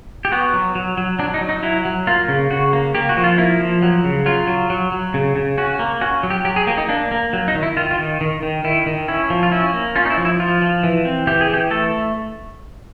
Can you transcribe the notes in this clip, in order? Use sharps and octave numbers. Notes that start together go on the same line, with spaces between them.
G4
B3 F#4
F#3
F#3
F#3
F#3 D4
D#4
F#3
D#4
F#3 E4
F#3
A#3 F4
C#3
C#3 F#4
A#3
A#3 G4
F#4
F3
F4
A#3 E4
F3
F#3
C#3
F#3 F4
F#3
F#3
F#3
C#3
C#3
C#4 F#4
A#3
C#4 F#4
F#3
G4
F#3 G4
G#4
A#3 G4
D#4
A#3 D4
A#3
F#3
D#4
D#3
E4
D#3 F4
F4
D#3
D#3
D#3
D#3 E4
D#3
C#4 E4
F3
F4
C#4 E4
A#3
C#4 F4
D#4
E4
F3
E4
F3 F4
F3
E3
C4
E3 G4
G#4
E3 G4
A3 A4